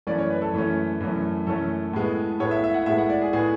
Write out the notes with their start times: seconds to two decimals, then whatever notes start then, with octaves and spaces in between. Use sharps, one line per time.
0.07 F#2 E3 A3 C#4 D5
0.18 C#5
0.30 B4
0.42 A4
0.53 F#2 E3 A3 C#4
1.00 F#2 E3 A3 C#4
1.47 F#2 E3 A3 C#4 A4
1.93 A2 G#3 B3
2.40 A2 G#3 B3 C#5
2.51 E5
2.64 E5
2.74 F#5
2.86 A2 G#3 B3 E5
2.98 F#5
3.09 D5
3.21 G#4
3.33 A2 G#3 B3 G#4